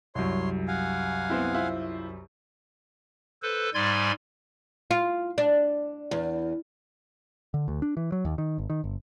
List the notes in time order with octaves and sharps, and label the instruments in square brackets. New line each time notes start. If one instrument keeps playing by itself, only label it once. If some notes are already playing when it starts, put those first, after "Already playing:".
[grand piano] C2 F#2 [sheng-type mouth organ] C#5 C6
[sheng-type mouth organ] F5 F#5 G#5
[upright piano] B3 C4 E4
E4 F4 C5
[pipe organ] A4 B4 C5
G#2 G3 D5 G#5 C6 G#6
[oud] F4
D4
E2
[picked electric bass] D3
D2
D4
E3
F#3
D#2
D#3
G#1
D#3
G1